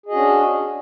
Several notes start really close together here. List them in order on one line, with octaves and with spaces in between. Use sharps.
G#4 D#5 F#4 C#4 D4